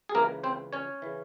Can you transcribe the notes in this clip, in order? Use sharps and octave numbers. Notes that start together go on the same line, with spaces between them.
G#4
C#2 C#3 E3 A#3 A#4
C4 C5
C#4 C#5
C#3 E3